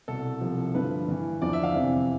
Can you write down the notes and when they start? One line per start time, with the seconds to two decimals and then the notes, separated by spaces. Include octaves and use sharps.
0.08 C2 B2 A4
0.41 C2 C3 F3
0.75 G2 D3 F3 B4
1.08 G2 E3
1.41 E2 D3 F3 D5
1.53 E5
1.63 F5
1.76 F2 C3 E3